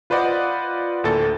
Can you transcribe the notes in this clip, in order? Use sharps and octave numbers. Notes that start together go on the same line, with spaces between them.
F4 B4 C5 D5 D#5 F#5
D2 A2 A#3 A4 A6